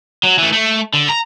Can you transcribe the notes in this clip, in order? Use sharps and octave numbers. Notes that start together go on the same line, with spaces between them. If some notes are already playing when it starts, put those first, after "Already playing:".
F#3
E3 A3
A3
D3
A#5